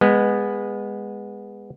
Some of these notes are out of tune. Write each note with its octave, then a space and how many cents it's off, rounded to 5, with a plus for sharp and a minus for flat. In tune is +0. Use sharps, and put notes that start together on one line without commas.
G#3 -20 B3 -5